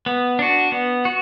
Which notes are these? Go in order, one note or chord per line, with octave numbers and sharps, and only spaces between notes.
B3
D4 F#4
B3
F#4